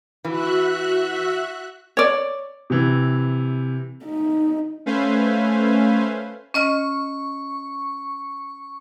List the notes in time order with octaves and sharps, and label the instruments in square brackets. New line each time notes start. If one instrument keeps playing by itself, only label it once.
[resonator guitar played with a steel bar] E3 [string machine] F#4 E5 F#6
[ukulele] C#5 D5
[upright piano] C3 E3
[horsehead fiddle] D#4
[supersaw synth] A3 C#4 B4 C5 F5 G#5
[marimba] C#4 D#5 F6 [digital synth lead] C#6